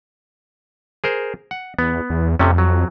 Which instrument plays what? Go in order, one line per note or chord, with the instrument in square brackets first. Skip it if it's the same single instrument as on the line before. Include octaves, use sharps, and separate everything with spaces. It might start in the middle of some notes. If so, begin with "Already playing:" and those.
[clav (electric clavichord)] G#4 A#4 C5
F#5
[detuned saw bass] E2 [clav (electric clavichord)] B3
[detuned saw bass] E2
[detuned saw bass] F2 [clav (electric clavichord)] C3 A3 C#4
[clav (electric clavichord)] F#3